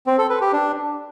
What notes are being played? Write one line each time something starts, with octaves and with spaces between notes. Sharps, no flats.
C4
A4
B4
G4
D4